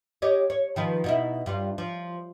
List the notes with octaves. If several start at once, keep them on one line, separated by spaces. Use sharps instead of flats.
G4 C#5 D#5
C#5
D#3 F3 B4
B2 D#4 E4
G2 G3 F4
F3